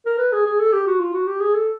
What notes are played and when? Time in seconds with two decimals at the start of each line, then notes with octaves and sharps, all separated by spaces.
0.06 A#4
0.19 B4
0.33 G#4
0.46 G#4
0.59 A4
0.73 G4
0.87 F#4
1.00 F4
1.14 F#4
1.27 G4
1.41 G#4
1.55 A4